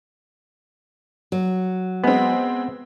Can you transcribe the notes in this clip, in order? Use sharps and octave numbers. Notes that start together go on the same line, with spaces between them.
F#3
G#3 B3 C4